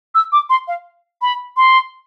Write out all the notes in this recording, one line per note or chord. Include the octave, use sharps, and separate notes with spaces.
E6
D6
C6
F5
B5
C6